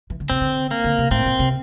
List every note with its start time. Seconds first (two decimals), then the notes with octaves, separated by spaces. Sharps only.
0.10 E3
0.20 D3
0.30 C3 C4
0.41 D3
0.71 A#3
0.84 D3
0.98 C3
1.11 A2 C4
1.26 A#2
1.39 C3